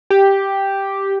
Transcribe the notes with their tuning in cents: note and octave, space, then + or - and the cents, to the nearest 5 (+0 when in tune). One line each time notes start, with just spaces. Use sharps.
G4 +0